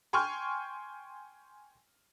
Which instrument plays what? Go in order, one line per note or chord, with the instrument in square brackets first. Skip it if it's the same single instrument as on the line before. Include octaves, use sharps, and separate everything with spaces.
[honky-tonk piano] G5 G#5 C6 C#6 F6